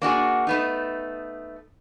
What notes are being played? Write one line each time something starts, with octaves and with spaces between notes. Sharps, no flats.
A#3 D4 F#4 G#4
A3 B3 D#4